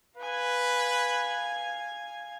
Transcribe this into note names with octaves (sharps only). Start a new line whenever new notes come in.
B4 F5 G#5